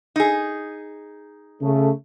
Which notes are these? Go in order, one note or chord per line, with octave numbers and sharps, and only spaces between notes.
D#4 G#4
C#3 A3